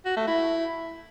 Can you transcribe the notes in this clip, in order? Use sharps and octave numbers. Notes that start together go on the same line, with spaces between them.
F#4
A3
E4